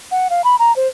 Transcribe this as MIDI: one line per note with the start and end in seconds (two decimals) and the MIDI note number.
0.11 0.28 78
0.30 0.41 77
0.44 0.56 83
0.59 0.75 82
0.76 0.87 72